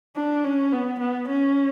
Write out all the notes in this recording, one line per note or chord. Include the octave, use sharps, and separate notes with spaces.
D4
C#4
B3
B3
C#4